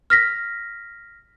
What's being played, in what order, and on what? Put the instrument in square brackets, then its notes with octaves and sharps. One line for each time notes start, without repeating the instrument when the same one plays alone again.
[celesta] F6 A#6 B6